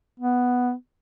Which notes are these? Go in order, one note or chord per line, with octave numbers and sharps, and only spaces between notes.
B3